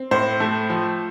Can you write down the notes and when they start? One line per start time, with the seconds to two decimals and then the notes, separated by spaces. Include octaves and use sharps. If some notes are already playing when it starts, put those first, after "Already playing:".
Already playing: C4
0.11 A2 C5
0.40 A3
0.70 F3